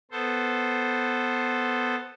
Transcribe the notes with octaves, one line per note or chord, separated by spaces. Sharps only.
B3 A4 C5